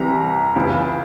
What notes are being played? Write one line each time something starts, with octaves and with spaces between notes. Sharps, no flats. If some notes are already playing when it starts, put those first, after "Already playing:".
Already playing: C2 C3 E3 G3 A#5
C#2 C#3 E3